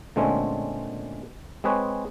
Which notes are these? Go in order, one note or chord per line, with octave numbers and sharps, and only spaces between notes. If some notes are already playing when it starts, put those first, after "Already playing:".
A#2 D3 G#3 A3 C4 C#4
G#3 C4 G#4 B4 C#5